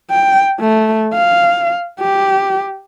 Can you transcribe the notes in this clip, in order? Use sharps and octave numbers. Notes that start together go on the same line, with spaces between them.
G5
A3
F5
G4